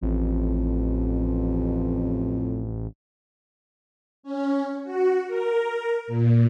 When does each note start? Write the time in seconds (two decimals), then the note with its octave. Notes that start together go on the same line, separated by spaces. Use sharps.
0.02 A1 F2
4.23 C#4
4.84 F#4
5.28 A#4
6.07 A#2